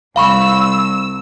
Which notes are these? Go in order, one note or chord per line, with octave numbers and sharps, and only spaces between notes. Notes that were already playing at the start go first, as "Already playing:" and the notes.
C2 F5 B5 C#6 E6